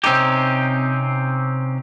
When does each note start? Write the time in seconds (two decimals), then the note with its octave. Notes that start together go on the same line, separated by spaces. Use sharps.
0.04 C3 C4 C#4 D#4 G4